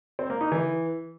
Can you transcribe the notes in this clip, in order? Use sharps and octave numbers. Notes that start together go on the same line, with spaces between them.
C4
A#3
D#4
E3